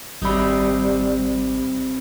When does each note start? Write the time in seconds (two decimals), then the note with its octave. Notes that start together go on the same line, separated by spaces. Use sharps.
0.22 G#1 C3 G3 D#4 B5